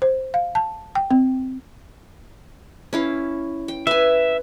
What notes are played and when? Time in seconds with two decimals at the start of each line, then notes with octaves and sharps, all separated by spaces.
0.02 C5
0.34 F5
0.55 A5
0.95 G5
1.11 C4
2.93 C#4 E4 F5
3.68 G5
3.87 B4 E5 G#5